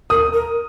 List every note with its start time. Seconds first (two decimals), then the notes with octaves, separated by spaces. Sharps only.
0.10 A#4 D#6
0.33 A#4